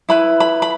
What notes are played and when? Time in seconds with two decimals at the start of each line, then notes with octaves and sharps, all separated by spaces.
0.09 E4 B4 B5
0.40 B5
0.62 B5